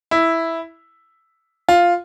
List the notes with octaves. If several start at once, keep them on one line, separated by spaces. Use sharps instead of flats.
E4
F4